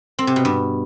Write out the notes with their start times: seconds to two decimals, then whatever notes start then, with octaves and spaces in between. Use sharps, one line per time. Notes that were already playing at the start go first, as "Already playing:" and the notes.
0.19 C4
0.27 C3
0.36 B2
0.45 G2